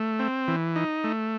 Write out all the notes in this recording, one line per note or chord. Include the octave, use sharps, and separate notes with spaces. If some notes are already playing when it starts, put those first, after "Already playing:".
Already playing: A3
C4
E3
D#4
A3